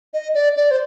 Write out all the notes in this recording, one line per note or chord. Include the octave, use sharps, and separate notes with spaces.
D#5
D5
D5
C5